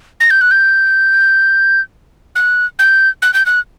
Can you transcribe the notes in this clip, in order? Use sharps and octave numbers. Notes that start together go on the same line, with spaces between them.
A#6
G6
F#6
G6
F#6
G6
F#6
G6
F#6